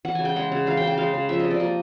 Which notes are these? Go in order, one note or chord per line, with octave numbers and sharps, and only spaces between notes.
E3 F#5
C#3 G#5
G5
G#3 F#5
C#3
E3 F5
C#3 G5
G5
G#3 F5
C#3
F3 E5
D#5
C3
D5
A#3 D#5